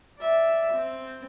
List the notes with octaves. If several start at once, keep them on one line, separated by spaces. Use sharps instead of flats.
D5 E5
C4